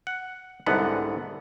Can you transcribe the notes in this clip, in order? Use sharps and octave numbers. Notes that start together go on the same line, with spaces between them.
F#5
C2 G#2 D3 B3 F#5